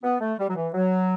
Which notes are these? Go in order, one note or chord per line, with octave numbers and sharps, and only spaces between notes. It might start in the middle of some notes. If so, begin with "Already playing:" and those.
B3
A3
G3
F#3
E3
F#3